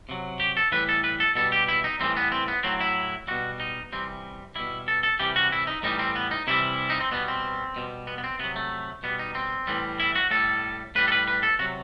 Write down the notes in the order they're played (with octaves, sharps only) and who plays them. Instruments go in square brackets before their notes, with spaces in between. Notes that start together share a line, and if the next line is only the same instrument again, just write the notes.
[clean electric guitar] C3 F#3
G4
A4
A2 E3 G3 B4
A4
B4
A4
B2 G3 A4
G4
E4
D#4
A2 E3 G3 C4
B3
C4
B3
A2 F#3 C4
E4
B2 G3 F#4
D#4
C3 E3 G3 C4
B2 G3 E4
A4
A4
C3 E3 G3 G4
F#4
E4
D#4
A2 E3 G3 D#4
C4
B3
D#4
C3 E3 G3 E4
D#4
C4
B2 G3 B3
C4
B2 G3
B3
B3
C4
C3 F#3 B3
A3
B2 G3 B3
D#4
C4
A2 E3 G3
E4
F#4
A2 G3 A4
A2 G3 B4
A4
B4
B4
A4
C3 F#3 F#4